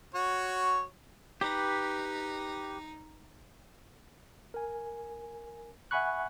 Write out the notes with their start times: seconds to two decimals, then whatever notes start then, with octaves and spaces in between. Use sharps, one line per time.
0.14 F#4 C#5
1.41 D#4 G4 B4
4.54 A#4 G#5
5.91 E5 F#5 G#5 B5 C#6 F#6